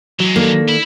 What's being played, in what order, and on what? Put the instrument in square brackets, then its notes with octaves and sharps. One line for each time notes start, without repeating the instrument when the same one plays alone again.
[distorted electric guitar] E3 G#3 [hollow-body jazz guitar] F#3
[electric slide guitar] D#3 D4 A4 [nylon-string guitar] A#3
[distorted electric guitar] E4